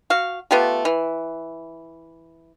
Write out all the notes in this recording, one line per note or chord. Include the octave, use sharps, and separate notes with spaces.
F#4 F5
A3 B3 F4 G4
E3